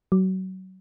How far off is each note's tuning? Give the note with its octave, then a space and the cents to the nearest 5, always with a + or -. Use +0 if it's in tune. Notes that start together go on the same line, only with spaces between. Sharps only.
F#3 +25